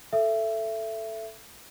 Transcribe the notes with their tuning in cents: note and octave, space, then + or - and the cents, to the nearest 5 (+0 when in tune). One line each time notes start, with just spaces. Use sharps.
A4 +0 E5 +20